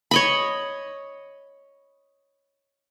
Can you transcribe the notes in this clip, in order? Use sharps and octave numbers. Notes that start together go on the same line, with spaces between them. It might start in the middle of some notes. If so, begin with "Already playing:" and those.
C#5 D#5 B5